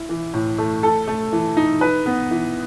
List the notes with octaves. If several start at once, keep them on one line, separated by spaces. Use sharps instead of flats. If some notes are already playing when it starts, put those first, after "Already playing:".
Already playing: E4
E3
A2
A3
A4
A3
E3
D#4
B4
B3
E3